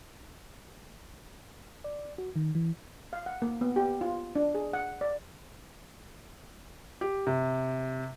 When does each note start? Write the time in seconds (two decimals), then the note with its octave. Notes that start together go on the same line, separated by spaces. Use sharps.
1.84 D5
2.18 F#4
2.36 D#3
2.55 E3
3.13 F5
3.26 F#5
3.42 A#3
3.61 B3
3.76 G4
4.01 F4
4.36 D4
4.55 G#4
4.73 F#5
5.01 D5
7.01 G4
7.27 C3